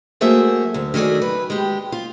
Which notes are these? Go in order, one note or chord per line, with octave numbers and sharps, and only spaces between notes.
F#3 A3 A#3 G#4 C5 E5
D2
D#3 F#3 A3 G#4 D5
B4
G#3 G4
F4